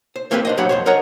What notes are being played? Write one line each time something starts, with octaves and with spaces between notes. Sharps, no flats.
C5
A3 A#3 C4 G4 A4 B4
D4 C5 D#5
B1 A2 F#3 G4 F#5 B5
F2 C5 C#5
A#4 C#5 D#5 F#5 A#5